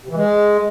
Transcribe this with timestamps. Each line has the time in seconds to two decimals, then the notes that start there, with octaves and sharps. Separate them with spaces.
0.05 C3
0.10 E3
0.16 G#3